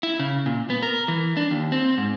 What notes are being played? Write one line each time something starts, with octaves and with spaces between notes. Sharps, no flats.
E4
C#3
A#2
B3
A#4
E3
D4
D#2
C4
G#2